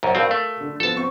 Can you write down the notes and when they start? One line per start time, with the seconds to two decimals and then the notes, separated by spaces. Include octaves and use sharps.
0.03 C2 F#2 A#5
0.15 G2 C4 F#4 A#4 F5
0.31 A3
0.61 D3
0.80 F3 B3 A4 A5
0.95 C4 C#6